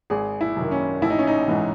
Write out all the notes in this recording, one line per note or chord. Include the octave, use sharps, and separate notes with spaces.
G#1 G#4
E4
F#2 D#3
C#4
A1 E4
D#4
C#4
D#4
G#2 E3